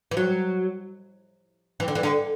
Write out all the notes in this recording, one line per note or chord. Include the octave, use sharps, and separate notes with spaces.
E3
F#3
E3
D3
E3
D3